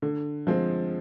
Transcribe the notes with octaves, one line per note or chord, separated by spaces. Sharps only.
D3
F3 G#3 C4